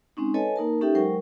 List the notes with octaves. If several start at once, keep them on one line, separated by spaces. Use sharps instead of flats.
G#3 C4 C#4 D#4
A4 B4 C#5 D#5 G#5 A5
A#3 D#4 A#4 A5
C#4 D#4 G4 A4 E5 G5
F#3 G#3 A#4 C5 G5 C#6